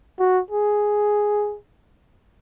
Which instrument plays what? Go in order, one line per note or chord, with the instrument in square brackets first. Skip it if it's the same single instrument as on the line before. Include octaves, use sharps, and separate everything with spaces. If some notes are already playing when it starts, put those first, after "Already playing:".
[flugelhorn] F#4
G#4